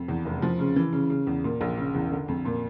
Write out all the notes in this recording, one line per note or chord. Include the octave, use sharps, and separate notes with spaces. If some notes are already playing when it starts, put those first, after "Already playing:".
Already playing: F2
E2
F1
F3
C#3
E3
C#3
C#3
E2
A#2
A#1
C#3
E2
D3
F2
A#2